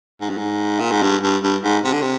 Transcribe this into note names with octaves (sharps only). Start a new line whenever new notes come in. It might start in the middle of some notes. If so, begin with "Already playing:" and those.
G#2
G2
G#2
A#2
G#2
G2
G2
G2
G#2
C3
D3
C3